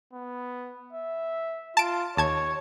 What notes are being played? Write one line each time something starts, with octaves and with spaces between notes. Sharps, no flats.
B3
E5
F4 A5 D7
D#2 C#5 A5 G#6